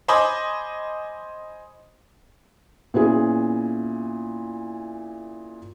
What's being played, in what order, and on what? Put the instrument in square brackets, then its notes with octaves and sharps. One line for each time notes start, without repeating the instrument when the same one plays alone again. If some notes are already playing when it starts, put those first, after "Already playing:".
[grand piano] C5 D#5 G#5 B5 D6
[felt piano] A#2 B3 C#4 E4 G#4